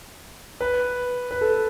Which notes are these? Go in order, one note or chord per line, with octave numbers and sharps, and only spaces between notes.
B4
B4
A4